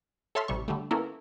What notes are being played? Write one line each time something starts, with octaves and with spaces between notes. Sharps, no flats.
A4 C#5 E5 A5 C6 F6
A1 C3 G3 C#6
D3 G3 A3
A#3 B3 C#4 E4 A4 A#4